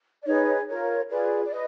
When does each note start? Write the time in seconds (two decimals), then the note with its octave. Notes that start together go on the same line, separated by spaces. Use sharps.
0.23 D5
0.26 D#4 G#4 B4 C#5
0.68 F4 A#4 C#5
1.10 F4 G#4 B4 D5
1.45 D5
1.51 B4 D#5